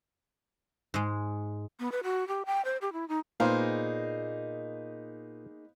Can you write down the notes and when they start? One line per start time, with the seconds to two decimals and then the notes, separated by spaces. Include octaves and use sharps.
0.94 G#2 G#3
1.80 B3
1.92 B4
2.04 F#4
2.28 G4
2.46 G5
2.65 C5
2.81 G4
2.93 E4
3.08 D#4
3.40 A#2 A#3 B3 D#4 G#4 C5 F5